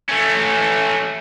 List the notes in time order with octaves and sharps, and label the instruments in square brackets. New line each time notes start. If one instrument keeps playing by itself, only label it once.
[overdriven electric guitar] A3 C#4